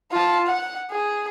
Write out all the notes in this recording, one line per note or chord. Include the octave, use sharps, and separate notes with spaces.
F4 A5
F#5
G#4